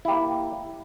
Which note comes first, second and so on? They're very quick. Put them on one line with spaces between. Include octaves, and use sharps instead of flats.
E4 G4 A#3